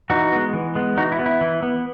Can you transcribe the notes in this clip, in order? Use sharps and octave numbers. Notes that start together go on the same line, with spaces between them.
E3 D#4 F#4
G#3 B3
E3
G#3 B3
E3 D#4 F#4
E4
B3
E4
E3
B3